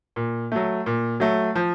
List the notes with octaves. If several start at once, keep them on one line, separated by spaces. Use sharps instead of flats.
A#2
F#3 A3
A#2
F#3 A3
F3